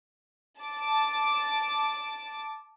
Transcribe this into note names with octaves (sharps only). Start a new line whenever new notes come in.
A5 D6